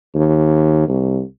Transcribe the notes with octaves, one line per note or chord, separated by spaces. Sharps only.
D#2
C2